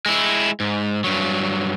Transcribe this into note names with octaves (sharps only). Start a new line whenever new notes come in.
G#3 E4
G#2
G2 F#3